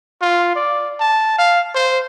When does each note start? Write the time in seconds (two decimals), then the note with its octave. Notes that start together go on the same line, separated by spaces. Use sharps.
0.22 F4
0.56 D5
1.00 A5
1.38 F5
1.75 C5